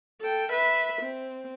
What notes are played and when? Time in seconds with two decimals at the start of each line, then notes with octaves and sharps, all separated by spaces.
0.21 A4 G5
0.52 B4 E5
1.01 C4